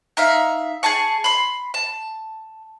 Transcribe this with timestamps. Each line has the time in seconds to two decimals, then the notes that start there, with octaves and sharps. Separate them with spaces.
0.17 D#4 E5 F5
0.83 G#4 G#5 A5 C#6
1.24 B5 C6
1.74 A5